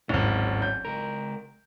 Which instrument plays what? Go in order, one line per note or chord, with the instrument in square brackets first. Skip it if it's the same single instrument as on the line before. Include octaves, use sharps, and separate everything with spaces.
[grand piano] D1 G#1 [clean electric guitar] C#4
[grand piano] G6
[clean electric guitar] C#2 A#4